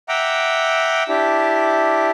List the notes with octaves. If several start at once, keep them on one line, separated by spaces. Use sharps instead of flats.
E5 F#5 G5 A#5 D6
D4 E4 G4